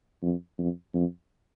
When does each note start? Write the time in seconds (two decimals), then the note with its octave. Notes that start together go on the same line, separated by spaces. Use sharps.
0.22 F2
0.58 F2
0.94 F2